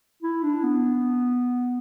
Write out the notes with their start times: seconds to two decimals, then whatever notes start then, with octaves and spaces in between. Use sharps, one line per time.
0.22 E4
0.43 D4
0.64 B3